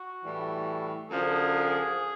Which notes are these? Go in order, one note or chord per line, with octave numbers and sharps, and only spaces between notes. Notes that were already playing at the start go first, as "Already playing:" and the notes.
Already playing: F#4
A2 E3 G3
F#2 D3 F3 G#4